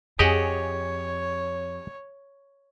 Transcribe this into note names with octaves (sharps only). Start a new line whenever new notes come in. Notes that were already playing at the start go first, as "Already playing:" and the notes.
F2 G4 G#4 C#5 D#5 F#5